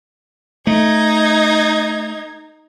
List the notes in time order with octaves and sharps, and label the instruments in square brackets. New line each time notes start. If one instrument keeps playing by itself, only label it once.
[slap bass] A3 [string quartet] D#4 G#6